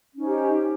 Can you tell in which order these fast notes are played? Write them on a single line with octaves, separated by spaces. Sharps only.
C#4 D#4 C5 G4